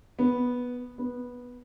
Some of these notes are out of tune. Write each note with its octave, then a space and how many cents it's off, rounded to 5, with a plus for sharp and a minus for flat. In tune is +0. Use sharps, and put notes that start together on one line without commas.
B3 -5
B3 -10